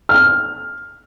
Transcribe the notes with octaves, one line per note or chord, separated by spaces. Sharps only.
F6